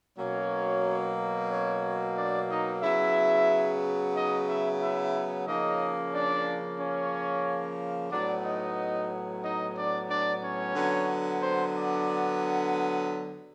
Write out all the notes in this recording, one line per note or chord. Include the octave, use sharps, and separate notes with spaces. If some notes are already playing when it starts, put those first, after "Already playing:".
B2 F#3 A#3 C#4 C#5
C#4 C#5
D4 D5
D#4 D#5
C#3 F#3 B3 E4 E5
D#4 D#5
E4 E5
E4 E5
C#3 F3 A#3 C#4 D#4 D#5
D4 D5
C#4 C#5
A2 F#3 B3 D4 D5
D#4 D#5
D#4 D#5
D4 D5
D4 D5
C#4 C#5
D3 F#3 B3
C4 C5
D4 D5